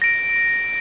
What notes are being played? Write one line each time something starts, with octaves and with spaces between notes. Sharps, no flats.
A#6 D7